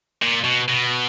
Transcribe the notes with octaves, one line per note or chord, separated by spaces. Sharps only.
A#2
B2
B2